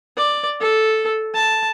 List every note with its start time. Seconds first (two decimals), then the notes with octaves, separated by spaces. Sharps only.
0.17 D5
0.61 A4
1.34 A5